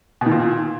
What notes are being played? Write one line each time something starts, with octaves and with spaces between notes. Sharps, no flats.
B2
D#3
A#2